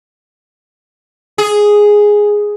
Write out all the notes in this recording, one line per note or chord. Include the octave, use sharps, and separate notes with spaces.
G#4